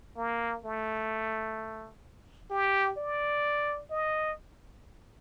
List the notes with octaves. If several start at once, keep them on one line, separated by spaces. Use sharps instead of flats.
A#3
A3
G4
D5
D#5